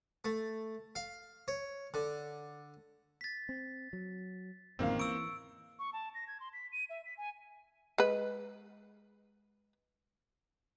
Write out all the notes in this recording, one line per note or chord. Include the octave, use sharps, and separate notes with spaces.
A3
F5
C#5
D3
A6 B6
C4
F#3
A1 D3 D#3 F3 G#3 A#3 C4 F5
E3 C#6 E6 D7
C#6
A5
A#6
G#6
C6
B6
D#7
E5
B6
G#5
G#3 B4